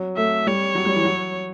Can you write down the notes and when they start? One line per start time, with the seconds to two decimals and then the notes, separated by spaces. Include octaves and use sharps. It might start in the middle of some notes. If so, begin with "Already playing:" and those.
Already playing: F#3
0.17 A3 E5
0.47 G3 C#5
0.75 F#3
0.85 G3
0.96 E3
1.05 F#3